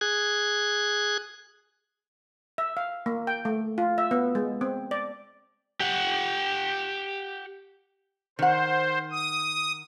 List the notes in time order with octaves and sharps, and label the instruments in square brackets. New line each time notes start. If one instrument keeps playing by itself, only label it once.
[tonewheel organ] G#4 F#6 G#6
[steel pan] E5
F5
A#3
G5
A3
F4
E5
B3
G#3
C4
D5
[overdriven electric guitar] G4 F#5
[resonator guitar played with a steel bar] D#3 F#5 [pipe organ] C5
[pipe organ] D#6